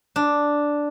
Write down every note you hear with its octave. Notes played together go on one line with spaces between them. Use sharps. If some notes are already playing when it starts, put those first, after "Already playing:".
D4